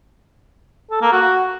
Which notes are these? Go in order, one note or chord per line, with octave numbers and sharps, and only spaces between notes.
A4
A#3
F#4